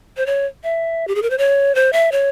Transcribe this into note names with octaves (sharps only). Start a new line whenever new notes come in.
C5
C#5
E5
G4
G#4
A#4
C5
C#5
C5
E5
C#5